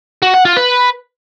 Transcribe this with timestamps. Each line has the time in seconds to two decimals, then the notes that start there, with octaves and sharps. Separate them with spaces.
0.23 F#4
0.34 F#5
0.45 F4
0.57 B4